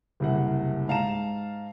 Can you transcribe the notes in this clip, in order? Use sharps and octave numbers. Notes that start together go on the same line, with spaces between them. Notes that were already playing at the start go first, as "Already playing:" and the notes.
F#1 C2 F#5
G#2 F5 A5 A#5 E7